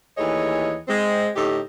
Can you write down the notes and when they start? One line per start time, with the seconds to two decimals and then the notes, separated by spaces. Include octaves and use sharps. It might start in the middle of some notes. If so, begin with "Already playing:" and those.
0.18 D#2 E3 A3 G#4 C#5 D#5
0.88 G#3 C4
1.36 A2 D3 D#4 G4